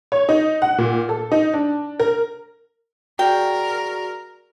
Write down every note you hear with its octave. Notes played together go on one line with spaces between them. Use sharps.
C#5
D#4
F#5
A#2
A4
D#4
D4
A#4
F#4 G#4 A#4 D5 G5